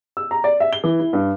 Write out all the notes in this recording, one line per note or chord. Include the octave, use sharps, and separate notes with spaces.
E6
A#5
D5
E5
G7
E3
E4
G2